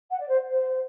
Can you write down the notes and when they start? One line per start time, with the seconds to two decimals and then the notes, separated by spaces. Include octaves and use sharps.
0.10 F#5
0.20 D5
0.28 C5
0.46 C5